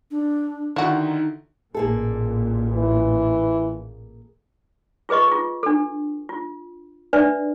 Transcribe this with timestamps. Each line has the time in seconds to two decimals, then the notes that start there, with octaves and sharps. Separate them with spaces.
0.11 D4
0.76 D3 D#3 D#4 E4 F#4
1.74 A1 A#2 A#3 G#4 A4
2.74 E3
5.09 F4 G#4 B4 D#5 C#6
5.28 F4 G#4
5.63 D4 A4
6.29 F4
7.13 D4 B4 D5 E5